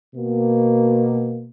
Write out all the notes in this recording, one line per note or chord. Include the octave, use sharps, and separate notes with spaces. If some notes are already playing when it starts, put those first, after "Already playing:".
B2 A#3